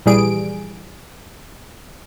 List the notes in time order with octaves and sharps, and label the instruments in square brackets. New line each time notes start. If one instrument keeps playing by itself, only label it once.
[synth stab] A#1 E3 G3 G#4 D7